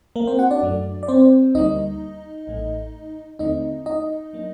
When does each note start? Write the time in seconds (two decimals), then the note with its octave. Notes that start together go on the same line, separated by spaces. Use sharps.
0.16 A#3 A#4
0.27 C4 C5
0.39 F#4 F#5
0.51 D4 D5
0.62 F#2 F#3 A3 D4
1.03 D5
1.08 C4 C5
1.55 D2 D3 G3 A#3 D#4 D#5
2.47 A1 A2 A3
3.39 D#2 D3 A3 C4 D#4 D#5
3.86 D#4 D#5
4.33 F#3 A#3 D4